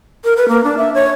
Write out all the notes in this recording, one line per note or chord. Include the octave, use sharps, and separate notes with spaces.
A#4
B4
A#3
D4
E5
C#5